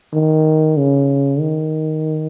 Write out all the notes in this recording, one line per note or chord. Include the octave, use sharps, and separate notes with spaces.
D#3
C#3
D#3